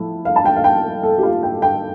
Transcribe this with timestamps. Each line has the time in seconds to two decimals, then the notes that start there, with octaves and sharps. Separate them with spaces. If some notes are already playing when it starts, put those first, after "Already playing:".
Already playing: A2 F3 A3
0.25 F5
0.36 A5
0.45 G5
0.56 F5
0.64 G5
1.03 A4
1.18 G4
1.23 F4
1.43 G5
1.62 G5